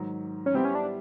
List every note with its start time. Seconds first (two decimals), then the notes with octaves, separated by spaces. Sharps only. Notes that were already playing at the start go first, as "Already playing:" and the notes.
Already playing: G#2 D#3 F#3
0.46 C#4
0.54 G3 B3 C4 E4 G4 C5
0.65 C#4
0.75 D4